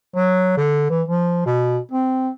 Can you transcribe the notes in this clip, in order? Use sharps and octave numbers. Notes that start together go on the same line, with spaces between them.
F#3
D3
E3
F3
B2
C4